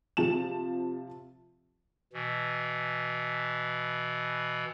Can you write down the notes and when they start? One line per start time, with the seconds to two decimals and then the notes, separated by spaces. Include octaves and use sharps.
0.17 C3 F3 A5 E7
2.13 B2 E3